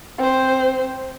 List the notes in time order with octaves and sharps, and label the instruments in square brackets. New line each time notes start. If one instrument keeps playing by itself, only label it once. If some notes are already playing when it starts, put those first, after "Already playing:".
[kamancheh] C4 C5